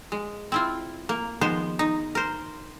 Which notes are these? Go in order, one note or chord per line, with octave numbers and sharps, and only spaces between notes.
G#3
C4 E4 F4
A#3
D#3 F3 G#3 B3 C5
D#4
A#4 C5